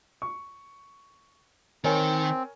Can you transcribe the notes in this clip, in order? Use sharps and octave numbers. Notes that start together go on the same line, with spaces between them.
C#6
D#3 C4 A#4 C#5 G#5